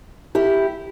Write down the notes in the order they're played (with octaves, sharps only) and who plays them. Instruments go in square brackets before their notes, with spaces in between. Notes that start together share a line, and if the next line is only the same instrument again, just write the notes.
[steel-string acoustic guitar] E4 G4